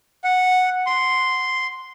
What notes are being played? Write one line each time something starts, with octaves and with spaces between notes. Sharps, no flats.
F#5
C6